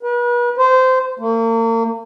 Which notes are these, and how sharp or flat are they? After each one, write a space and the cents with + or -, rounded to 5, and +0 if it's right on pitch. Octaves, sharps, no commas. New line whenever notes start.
B4 -40
C5 -20
A#3 -40